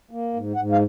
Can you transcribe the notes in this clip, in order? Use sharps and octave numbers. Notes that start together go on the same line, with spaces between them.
A#3
G#2
G#2 F#5
F5